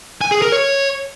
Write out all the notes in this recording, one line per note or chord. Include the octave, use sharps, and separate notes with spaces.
G#5
G#4
A#4
C#5